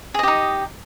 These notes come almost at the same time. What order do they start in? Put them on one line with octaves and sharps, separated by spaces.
G#4 D#5 G4 D#4